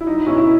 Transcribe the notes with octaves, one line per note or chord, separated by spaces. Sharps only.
E4
F#3 D#4
B2 C#4 E4
E4